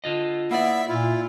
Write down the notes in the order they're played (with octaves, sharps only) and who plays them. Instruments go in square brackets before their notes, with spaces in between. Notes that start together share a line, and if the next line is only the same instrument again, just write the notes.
[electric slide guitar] D3 F4 D#5
[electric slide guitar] A#3 D5 [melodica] B3 E4 [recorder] E5
[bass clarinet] A#2 [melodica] E4 [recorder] F4